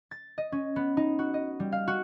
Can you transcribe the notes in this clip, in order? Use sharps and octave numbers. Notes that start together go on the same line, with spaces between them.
A6
D#5
C#4
B3
D#4
F#4
D#5
G3
F5
F#4